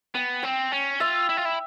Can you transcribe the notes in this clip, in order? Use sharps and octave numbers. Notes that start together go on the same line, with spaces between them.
B3 G5
C4 G5
C#4
F4 E5
E4
F4
E4